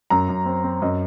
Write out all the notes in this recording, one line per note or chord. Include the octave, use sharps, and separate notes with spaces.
F#2 A#5
F#2
C4
C4
F#2 D#5